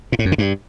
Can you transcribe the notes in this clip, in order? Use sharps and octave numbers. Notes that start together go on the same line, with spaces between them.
A#2
A2
F#2
D3
G2